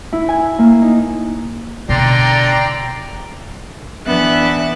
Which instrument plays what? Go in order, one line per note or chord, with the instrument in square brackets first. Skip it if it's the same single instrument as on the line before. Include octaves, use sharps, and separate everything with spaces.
[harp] E4
G#5
A#3
D#4
[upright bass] B2 [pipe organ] D3 C6 [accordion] D5 G5 A#5
[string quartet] E3 B3 D4 E5 F#6 A6